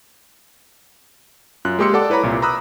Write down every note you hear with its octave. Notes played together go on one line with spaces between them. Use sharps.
F#2 F4 F#6
G#3 A#3 G4 C6 E6 C#7
A4 D5 F#5 A5 D6
E4 B4 C#5 A#5 B5
C2 A#2 E4
A#5 B5 D#6 E6 F#6